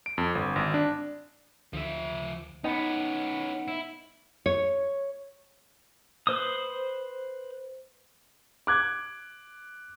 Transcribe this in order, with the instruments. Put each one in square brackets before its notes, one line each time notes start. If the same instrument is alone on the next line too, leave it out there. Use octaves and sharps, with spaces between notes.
[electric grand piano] D7
F2
G1
G#1
D4
[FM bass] D2 [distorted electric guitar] F3 E5
[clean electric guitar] B3 [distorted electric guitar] C#4 B4 [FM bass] D#4
[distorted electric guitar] E4
[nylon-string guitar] C#5
[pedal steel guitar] B4 C5 D#6
[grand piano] D6 F#6 G#6